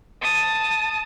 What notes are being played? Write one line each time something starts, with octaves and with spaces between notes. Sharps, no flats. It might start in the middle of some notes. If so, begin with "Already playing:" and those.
A5 D#6